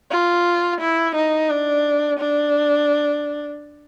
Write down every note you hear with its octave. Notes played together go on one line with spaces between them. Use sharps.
F4
E4
D#4
D4
D4